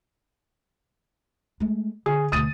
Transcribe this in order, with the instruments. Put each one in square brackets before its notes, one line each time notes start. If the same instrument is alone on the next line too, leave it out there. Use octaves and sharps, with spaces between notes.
[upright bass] G#3 A3
[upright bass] D3 [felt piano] G#4
[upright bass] D2 B2 [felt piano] D#6 A6 D#7